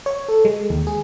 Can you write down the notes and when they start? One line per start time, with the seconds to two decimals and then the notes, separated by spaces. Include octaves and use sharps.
0.06 C#5
0.28 A4
0.45 G#3
0.70 D#2
0.87 G#4